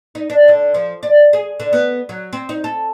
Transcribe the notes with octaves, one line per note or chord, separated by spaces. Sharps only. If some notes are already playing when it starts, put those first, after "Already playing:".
D#4
D4
D3
F3
D5
G#4
D3
B3
F#3
C4
D#4
A4